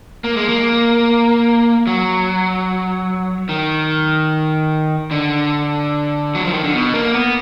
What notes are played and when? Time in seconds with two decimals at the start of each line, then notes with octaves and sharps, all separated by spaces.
0.24 A#3
0.37 G#3
0.49 A#3
1.87 F#3
3.49 D#3
5.11 D3
6.35 F#3
6.45 F3
6.54 D#3
6.64 D3
6.74 B2
6.94 A#3
7.14 B3